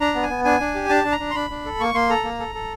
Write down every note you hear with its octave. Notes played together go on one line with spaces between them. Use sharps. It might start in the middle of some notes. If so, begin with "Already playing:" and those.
D4 A#5
B3
G#5
B3
D4 G#5
D4
G4
D4 A5
D4
A#5
D4
C6
D4 B5
D4
A4
A#3 C#6
A#3 C6
A4 A#5
A#3
A4
A4